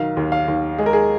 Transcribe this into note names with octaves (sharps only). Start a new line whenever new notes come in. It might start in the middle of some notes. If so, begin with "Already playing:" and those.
Already playing: B1 D#3 F5
D#2
F5
D#2
G#3 G#4
A#4
G#4